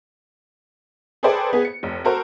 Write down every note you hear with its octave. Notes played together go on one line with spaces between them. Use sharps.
G#4 A4 B4 C5 D5 G5
B3 G#4
C#7
F1
F#4 A4 A#4 C5